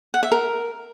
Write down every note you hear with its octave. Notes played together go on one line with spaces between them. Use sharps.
F#5
E5
A#4